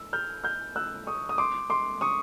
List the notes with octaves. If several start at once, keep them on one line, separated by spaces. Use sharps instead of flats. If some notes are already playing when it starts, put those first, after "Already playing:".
Already playing: E6
F6 G6
F6 G6
E6 F#6
C#6 D#6
D#6
C6 D6
C6 D6
C#6 D#6